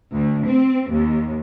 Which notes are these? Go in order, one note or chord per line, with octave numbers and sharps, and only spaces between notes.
D2
C4
D#2